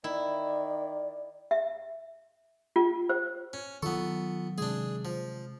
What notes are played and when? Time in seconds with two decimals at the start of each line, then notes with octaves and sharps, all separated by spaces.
0.04 D#3 E4 D5
1.51 E5
2.76 F4
3.09 C5
3.53 C#4
3.83 D#3 F#3 B3 F4 A4 C#6
4.58 C3 G#3 D4 G#4
5.05 F3